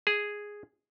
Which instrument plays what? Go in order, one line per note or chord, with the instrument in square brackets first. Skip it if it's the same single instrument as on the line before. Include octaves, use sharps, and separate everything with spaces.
[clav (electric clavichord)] G#4